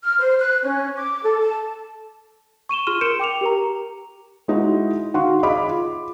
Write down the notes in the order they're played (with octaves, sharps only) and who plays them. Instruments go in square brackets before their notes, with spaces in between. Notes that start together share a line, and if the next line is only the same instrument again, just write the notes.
[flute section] F6
C5
F#6
C#4
D6
A4
A5
[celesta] C#6 D#7 E7 G7
F4 G#4 C6 F6 D#7 G7
A#4 C6 G6 C#7 D7 E7
G5 D6 C#7 F7
G4 A#4 A#5
[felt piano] G#3 D#4 E4 F#4
D#3 F#4 F5 C6
G#4 D#5 F5 B5 D6
F4